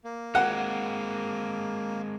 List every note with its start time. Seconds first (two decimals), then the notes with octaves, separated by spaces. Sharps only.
0.04 A#3
0.35 G#3 C4 F#5